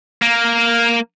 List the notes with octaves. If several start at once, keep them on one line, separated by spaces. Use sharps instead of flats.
A#3